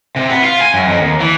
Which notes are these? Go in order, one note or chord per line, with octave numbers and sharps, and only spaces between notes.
C3
B3
F4
G#5
F#2
F2
D#2
E3